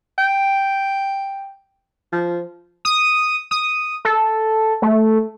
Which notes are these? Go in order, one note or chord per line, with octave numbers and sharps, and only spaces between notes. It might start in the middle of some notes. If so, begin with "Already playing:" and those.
G5
F3
D#6
D#6
A4
A3